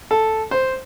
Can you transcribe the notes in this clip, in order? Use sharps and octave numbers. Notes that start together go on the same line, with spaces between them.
A4
C5